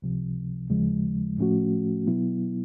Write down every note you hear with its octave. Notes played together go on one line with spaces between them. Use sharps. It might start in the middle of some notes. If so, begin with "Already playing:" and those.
C#2 C3 F3
D#2 C#3 F3 G#3
A2 F3 A3 C#4 F#4
B2 F#3 B3 E4